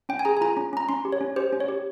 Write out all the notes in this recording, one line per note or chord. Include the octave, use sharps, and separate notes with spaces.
C#4 G5
G#5
G#4 A#5
G#5
F4 A#5
C#4
C#4 A#5
C#4 C6
G4
C#5
C#4
G4 C5
C#4
C#5
G4